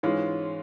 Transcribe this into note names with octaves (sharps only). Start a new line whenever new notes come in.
G#2 E3 G#3 C#4 F4